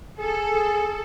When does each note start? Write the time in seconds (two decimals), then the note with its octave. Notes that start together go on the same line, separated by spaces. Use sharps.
0.19 G#4 A4